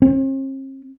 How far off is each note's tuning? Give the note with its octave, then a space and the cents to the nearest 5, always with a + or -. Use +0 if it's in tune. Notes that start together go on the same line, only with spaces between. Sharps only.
C4 +45